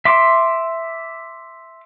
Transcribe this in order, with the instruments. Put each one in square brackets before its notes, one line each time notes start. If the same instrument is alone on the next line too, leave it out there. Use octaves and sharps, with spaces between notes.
[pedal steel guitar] E5 C6 D6